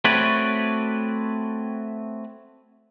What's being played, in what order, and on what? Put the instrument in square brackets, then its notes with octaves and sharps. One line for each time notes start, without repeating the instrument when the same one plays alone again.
[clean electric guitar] A3 C4 F#4 B4 C#5 D5